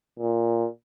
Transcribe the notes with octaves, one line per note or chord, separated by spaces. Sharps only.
A#2